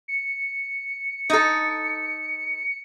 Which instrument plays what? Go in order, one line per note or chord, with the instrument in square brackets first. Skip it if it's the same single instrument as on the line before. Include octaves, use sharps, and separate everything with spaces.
[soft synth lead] C#7
[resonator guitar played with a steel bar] D#4 A4